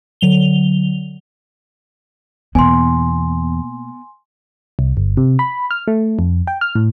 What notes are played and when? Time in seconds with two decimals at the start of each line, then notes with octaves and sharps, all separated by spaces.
0.21 D3 F#3 F7 G7
2.55 E2 B2 A#3 B3 G#5 C6
4.79 C2
4.97 G1
5.17 C3
5.39 B5
5.71 F6
5.88 A3
6.19 F2
6.47 G5
6.61 F6
6.75 A2